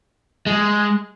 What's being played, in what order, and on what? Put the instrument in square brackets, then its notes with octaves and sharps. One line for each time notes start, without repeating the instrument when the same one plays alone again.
[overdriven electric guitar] G#3